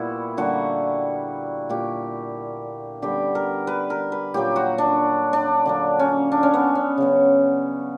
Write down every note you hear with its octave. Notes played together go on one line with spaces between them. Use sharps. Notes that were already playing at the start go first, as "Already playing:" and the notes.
Already playing: A#2 G3 B3 E4 F#4
D3 G3 A#3 F#4
A#2 A#3 G4
D3 G3 B3 G4
A#4
B4
A#4
B4
A#2 F#3 A#3 G4
F#4
D4
D4
D3 F#3 A#3
C#4
D4
C#4
B3
C#4
C#3 F#3 B3